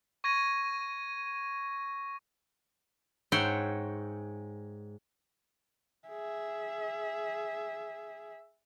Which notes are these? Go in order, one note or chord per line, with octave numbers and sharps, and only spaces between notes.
C#6 G#6 A#6 D#7
G#2 C#5 E5 F#5 G5 C6
G#4 E5